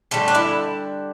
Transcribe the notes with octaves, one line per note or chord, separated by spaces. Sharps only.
D3 G3 A3
D4
E4